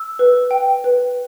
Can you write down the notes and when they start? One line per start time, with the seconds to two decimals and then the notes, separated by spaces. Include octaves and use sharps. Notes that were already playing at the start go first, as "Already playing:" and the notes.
Already playing: E6
0.19 B4
0.51 G5
0.84 B4